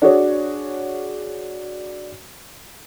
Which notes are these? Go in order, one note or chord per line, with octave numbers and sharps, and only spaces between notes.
D4 F#4 G#4 C#5